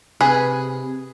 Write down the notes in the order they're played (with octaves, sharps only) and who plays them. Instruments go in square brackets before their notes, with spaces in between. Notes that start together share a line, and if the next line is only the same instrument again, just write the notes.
[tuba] C3 [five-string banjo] G#4 B4 [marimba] G#5